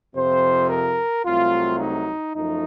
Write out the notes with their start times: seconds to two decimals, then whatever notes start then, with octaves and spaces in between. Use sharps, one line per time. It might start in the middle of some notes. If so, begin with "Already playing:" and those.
0.15 F2 C3 F3 C5
0.70 A#4
1.25 C2 C3 F#3 A3 F4
1.79 D#4
2.34 F#2 F3 A3 D#4